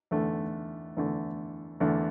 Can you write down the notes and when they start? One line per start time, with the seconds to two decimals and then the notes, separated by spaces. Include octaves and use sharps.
0.11 E2 D3 A3
0.97 E2 D3 A3
1.80 E2 D3 A3